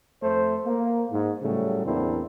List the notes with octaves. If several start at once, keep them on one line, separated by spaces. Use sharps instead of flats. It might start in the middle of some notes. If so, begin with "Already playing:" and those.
F2 A3 C5
A#3
G#2
A2 C#3 F#3 G3 A3
E2 A#3 C4 D4 E4